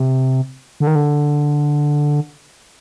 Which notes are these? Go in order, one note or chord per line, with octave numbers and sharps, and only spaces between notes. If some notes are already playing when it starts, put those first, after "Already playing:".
Already playing: C3
D3
D#3
D3